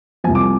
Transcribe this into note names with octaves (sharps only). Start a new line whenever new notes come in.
C2 C3 F3 G#5
D6